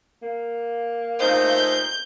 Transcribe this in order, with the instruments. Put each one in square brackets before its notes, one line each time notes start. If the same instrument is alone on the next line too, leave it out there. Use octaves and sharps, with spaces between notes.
[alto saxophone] A#3
[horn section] A#2 A3 D#4 [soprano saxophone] C5 [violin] G6